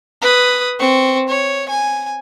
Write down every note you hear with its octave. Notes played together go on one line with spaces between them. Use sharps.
B4 D#6
C4 C#6
C#5
G#5